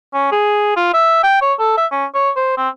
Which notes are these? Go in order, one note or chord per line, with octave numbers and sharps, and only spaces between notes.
C#4
G#4
F4
E5
G5
C#5
A4
E5
C#4
C#5
C5
C4